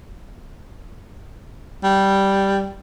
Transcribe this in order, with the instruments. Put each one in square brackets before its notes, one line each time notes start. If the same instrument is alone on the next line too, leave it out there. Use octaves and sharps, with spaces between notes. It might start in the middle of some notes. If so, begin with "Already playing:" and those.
[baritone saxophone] G3